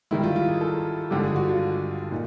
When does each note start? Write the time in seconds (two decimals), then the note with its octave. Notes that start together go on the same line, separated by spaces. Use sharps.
0.11 G#2 D#3 G3 E4
0.24 F4
0.36 F4
0.48 G#4
0.61 A4
1.11 G2 D3 F3 G#3 G4
1.19 A4
1.23 G#4
1.36 F#4
1.49 F4
2.11 A#2 D#4